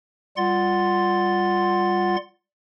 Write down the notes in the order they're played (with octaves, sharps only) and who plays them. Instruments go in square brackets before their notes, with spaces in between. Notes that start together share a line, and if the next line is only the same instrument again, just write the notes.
[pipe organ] G3 F4 F#5 C6 A6